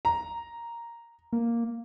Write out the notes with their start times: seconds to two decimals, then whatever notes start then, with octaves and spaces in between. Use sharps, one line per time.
0.05 A#5
1.33 A#3